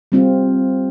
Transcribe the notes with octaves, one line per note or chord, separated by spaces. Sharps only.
G3 C4 F4